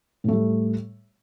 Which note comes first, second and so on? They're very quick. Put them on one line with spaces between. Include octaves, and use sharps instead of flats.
A2 A3 G3